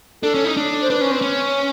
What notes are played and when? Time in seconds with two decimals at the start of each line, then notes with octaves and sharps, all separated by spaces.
0.22 D4 A4
0.34 C#4
0.45 D#4
0.57 D4
0.82 C5
0.90 D4 B4
1.01 C#4
1.11 C4
1.22 C#4